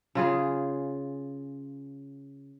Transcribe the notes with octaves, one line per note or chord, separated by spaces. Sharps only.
C#3 F4 G#4